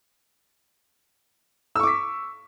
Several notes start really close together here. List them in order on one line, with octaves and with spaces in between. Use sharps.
E6 C#6 D6 B6